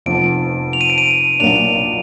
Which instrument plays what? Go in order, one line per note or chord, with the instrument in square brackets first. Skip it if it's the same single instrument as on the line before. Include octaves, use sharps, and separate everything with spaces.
[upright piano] F1 F2 F3 B3 [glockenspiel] D7
[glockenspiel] F7
D#7
D7
D#7
[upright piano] B1 A#2 F#3 A#3 D4 [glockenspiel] F7